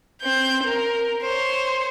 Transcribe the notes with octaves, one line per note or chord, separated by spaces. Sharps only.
C4 G6
A#4
C5 C#5